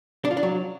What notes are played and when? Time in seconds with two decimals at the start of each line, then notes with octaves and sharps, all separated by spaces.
0.25 D4
0.31 F4
0.37 D4
0.43 F#3